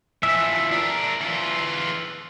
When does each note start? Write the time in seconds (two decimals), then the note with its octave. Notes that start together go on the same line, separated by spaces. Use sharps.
0.23 E3 F3 E5
0.72 D4 A#4
1.21 E3 F4